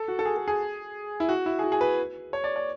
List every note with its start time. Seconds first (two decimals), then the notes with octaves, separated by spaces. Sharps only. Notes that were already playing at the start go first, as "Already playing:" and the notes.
Already playing: A4
0.08 F#4
0.19 A4
0.25 G#4
0.37 A4
0.48 G#4
1.20 E4
1.29 F#4
1.46 E4
1.59 G#4
1.64 F#4
1.72 G#4
1.81 B4
2.33 C#5
2.44 D5
2.56 D5